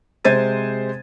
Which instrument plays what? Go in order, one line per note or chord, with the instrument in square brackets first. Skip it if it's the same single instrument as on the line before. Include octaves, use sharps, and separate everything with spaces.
[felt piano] C3 G#3 C5 G#6 A6 D#7